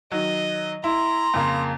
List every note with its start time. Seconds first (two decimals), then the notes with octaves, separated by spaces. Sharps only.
0.12 D#3 F#3 D#5
0.84 E4 A#5 C6
1.34 F2 C#3 A#3